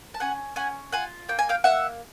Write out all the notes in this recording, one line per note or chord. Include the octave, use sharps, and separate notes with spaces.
A5
C#4 F#5 G#5
C#4 F#5 G#5
F4 F#5 G#5
A#3 G5
G#5
F5 G5
A#3 E5 F#5